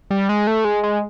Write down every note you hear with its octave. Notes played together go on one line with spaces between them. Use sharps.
G3
G#3
A3
G#3
G#3